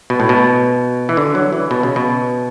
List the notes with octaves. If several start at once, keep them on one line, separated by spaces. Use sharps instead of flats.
B2
A2
B2
E3
D3
F#3
E3
B2
C#3
B2